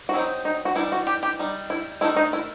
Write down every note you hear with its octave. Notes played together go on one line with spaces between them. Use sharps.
F#4
F#3 C4 D#4 E4
D#4
F#4
E3 G3 D#4 E4
F#4
G4
G4
G3 D#4
E4
D#3 A3 D#4 E4
D#4
E4